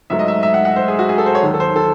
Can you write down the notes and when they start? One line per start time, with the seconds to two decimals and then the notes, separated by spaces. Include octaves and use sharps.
0.10 G#2 F#3 A3 E5
0.19 D#5
0.28 E5
0.43 E5
0.54 F#5
0.65 F#5
0.76 C5
0.88 G#4
0.99 F#4
1.09 G#4
1.18 A4
1.26 C5
1.35 C#5
1.43 D#2 D#3 F#3
1.54 A4
1.60 C5
1.76 A4